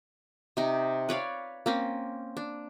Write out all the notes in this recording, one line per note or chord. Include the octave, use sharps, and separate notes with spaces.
C3 D#4
B4 C#5 D5 F5
A#3 C4 C#4
D4